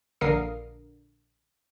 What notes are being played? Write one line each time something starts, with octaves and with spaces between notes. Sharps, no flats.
A#1 D3 A#4 F5 D#6 C7